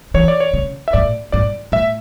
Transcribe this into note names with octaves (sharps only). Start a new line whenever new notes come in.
E3 C#5
D5
C#5
C#3
E5
A2 D5
G#2 D5
A2 E5